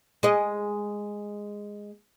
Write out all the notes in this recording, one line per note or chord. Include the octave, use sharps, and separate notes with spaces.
G#3 D#5